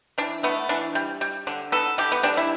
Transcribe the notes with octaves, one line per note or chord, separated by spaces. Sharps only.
E3 D4
A3 B3
E3 D4
G3
G3
D3
B3 A4
D3 G4
B3
G3 D4
E4